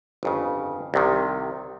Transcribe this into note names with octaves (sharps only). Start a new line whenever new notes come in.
G1 F2 C#3
C2 C3 D#3